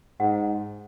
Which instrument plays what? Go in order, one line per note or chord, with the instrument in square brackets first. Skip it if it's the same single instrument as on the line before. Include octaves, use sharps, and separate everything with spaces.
[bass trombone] G#2 [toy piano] F#5